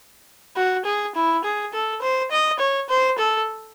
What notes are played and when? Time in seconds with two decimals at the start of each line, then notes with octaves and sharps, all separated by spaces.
0.56 F#4
0.85 G#4
1.15 E4
1.44 G#4
1.73 A4
2.02 C5
2.31 D#5
2.59 C#5
2.89 C5
3.18 A4